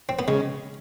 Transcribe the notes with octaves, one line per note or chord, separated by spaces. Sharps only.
C4
B3
C#3 G#3